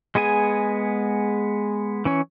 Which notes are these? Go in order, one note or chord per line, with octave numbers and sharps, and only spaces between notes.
G#3 B3 G#4 G#5
E3 C#4 C#5